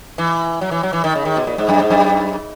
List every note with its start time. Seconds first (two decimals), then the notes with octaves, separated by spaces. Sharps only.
0.18 E3
0.61 F#3
0.71 E3
0.83 F#3
0.93 E3
1.04 D#3
1.15 C#3
1.25 D#3
1.37 B2
1.47 A#2
1.58 G#2
1.69 F#2
1.80 G#2
1.90 F#2